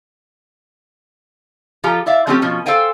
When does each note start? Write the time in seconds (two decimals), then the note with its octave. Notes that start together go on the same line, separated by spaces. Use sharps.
1.84 F3 F4 G4 A4 A#5
2.06 E4 D5 E5 F5
2.27 F3 A3 C4 C#4 E4 G4
2.42 B2 F3 C#4
2.66 A4 C5 F5 G5 G#5